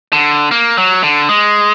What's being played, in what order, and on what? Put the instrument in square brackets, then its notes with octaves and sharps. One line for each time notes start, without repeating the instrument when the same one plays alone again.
[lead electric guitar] D3
A#3
F#3
D3
G#3